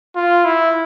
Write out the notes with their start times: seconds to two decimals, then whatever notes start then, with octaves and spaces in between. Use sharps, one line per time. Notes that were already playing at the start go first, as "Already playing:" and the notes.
0.16 F4
0.45 E4